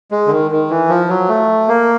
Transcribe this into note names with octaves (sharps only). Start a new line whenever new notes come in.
G#3
D3
D#3
D#3
E3
F3
F#3
A3
A#3